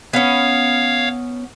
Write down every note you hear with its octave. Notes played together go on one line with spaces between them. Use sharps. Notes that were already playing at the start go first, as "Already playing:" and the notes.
B3 C#4 C#5 F5